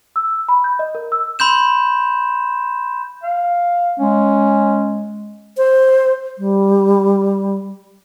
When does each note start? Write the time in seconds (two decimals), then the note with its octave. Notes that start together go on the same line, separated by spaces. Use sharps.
0.16 E6
0.48 B5
0.64 G6
0.79 D#5
0.95 A#4
1.12 E6
1.39 B5 C6 G6 E7
3.23 F5
3.99 G#3 C#4
5.57 C5
6.38 G3